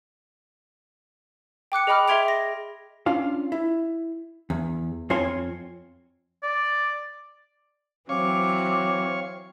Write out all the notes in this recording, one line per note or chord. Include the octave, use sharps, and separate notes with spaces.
G5 D6 F#6 C#7
G#4 D#5 G5 B5 D6 F6
G#4 E5 C6 G#6 D7 F7
A#6
C#4 D4 F4 F5
E4
E2
F2 C4 F4 C#5 G#5 C6
D5
E3 F#3 C4 C#5 F5 C#6 D6